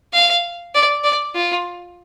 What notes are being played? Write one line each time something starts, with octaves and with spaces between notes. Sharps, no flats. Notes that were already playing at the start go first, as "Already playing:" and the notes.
F5
D5
D5
F4